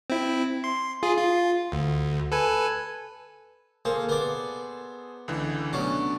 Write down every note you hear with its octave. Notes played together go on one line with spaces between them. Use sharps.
C4 E4
C6
F4 G#4
F4
D2
A4 B4 G#5
A#3 G#4 A4 C5
B3 D5
C#2 D3 E3
F#3 A3 B3 C#4 D4